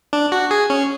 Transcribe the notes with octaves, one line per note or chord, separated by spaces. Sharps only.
D4
F#4
G#4
C#4